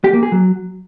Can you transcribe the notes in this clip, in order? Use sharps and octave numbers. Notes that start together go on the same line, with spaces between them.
G4
A#3
G#4
F#3